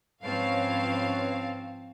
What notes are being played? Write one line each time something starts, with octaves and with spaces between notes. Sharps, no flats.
G#2 F3 C4 C#4 B4 C#5 F5 A5